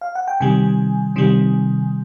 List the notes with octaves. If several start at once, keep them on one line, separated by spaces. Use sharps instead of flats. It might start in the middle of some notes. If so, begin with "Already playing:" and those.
F5
F#5
G5
C3 D#3 G3 G#5
C3 D#3 G3